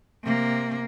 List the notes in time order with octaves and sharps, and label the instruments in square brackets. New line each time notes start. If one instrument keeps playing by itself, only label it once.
[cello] C3 A#3